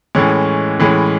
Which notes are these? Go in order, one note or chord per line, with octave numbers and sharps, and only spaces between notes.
A2 E3 G#3 C#4
A2 E3 G#3 C#4